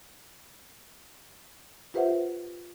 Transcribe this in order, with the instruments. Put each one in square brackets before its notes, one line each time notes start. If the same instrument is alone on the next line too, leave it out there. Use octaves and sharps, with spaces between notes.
[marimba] F4 G4 B4 C5 E5 F#5